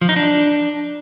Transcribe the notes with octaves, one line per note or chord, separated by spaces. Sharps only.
F3
D#4
D4